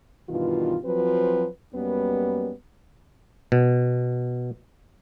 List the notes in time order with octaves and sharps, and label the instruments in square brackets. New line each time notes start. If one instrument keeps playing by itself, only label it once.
[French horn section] G2 B2 D#3 E3 F4
F3 F#3 C4 F#4 B4
F#2 G3 A#3 B3 C#4 B4
[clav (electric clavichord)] B2